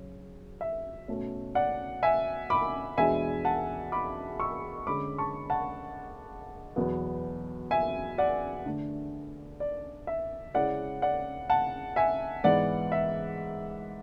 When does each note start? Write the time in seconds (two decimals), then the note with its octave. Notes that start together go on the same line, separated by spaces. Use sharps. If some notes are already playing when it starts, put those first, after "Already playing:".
Already playing: C#3 F#3 C#4
0.61 E5
1.08 B2 A3 C#4
1.55 D5 F#5
2.03 E5 G#5
2.50 B5 D6
2.98 E2 B2 G#3 D4 E5 G#5
3.45 F#5 A5
3.92 B5 D6
4.40 C#6 E6
4.87 D3 G#3 C#4 B5 D6
5.18 A5 C#6
5.50 F#5 A5
6.76 E2 B2 F#3 B3
7.71 E5 G#5
8.18 D5 F#5
8.66 D3 A3 D4
9.60 D5
10.07 E5
10.54 C#3 G#3 C#4 E4 D5 F#5
11.02 D5 F#5
11.50 F#5 A5
11.96 E5 G#5
12.44 G#2 E3 B3 D5 F#5
12.92 E5